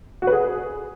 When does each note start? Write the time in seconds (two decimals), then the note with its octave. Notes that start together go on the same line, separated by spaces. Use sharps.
0.22 F#4
0.27 B4
0.32 G#4